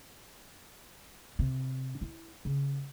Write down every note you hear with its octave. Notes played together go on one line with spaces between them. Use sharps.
C3
E4
C#3